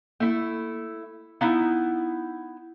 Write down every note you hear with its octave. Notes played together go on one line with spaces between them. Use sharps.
A3 A#3 E4
B3 D#4 E4 F5 A#5